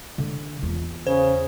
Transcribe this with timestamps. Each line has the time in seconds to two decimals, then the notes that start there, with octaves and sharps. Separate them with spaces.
0.18 D3
0.63 E2 F4
1.07 C#3 C5